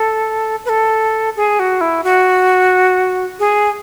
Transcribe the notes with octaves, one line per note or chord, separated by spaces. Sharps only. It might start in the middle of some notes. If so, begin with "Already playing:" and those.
Already playing: A4
B4
A4
G#4
F#4
E4
F#4
G#4